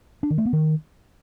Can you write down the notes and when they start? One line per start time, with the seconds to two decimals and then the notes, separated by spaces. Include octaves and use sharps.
0.23 D4
0.30 D#3
0.38 A3
0.45 B3
0.53 D#3